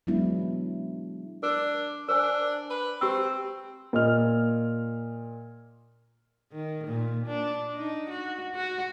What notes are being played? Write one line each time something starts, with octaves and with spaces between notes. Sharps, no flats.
F#3 G#3 B3 D4 E4
D4 A#4
D4 A#4 C5 G#5
B4
C4 G4 E6
A#2 D#5 F6
D#3
A#2
D4
D#4
F#4
F#4